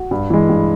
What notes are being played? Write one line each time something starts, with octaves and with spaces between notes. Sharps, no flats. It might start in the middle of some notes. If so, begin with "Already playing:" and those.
Already playing: F#4
G2
E3 G#3
G2